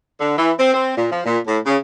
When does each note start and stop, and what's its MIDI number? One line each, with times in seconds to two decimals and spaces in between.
0.20 0.35 50
0.37 0.51 52
0.58 0.72 60
0.74 0.93 60
0.96 1.07 46
1.11 1.21 53
1.25 1.38 46
1.46 1.58 45
1.64 1.75 49